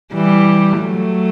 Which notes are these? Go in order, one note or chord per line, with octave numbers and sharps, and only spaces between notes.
E3 G3
F#3 A3